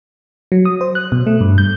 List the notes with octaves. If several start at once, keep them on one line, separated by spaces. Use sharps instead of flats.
F#3
D#6
C5
F#6
B2
A3
G2
G6